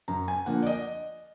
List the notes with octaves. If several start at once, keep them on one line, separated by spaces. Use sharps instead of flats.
F#2 A#5
G#5
D3 F3 A#3 F#5
D5
D#5